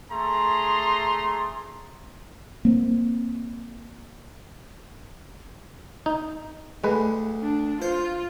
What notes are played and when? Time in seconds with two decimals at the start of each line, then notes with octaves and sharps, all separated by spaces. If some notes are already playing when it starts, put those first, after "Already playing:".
0.10 A3 G#4 A#5 C6
2.65 A#3 C4
6.06 D#4
6.84 D2 G#3 B4
7.43 D4
7.82 F4 C5